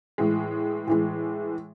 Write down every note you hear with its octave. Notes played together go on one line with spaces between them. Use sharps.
A2 E3 G#3
A2 E3 G#3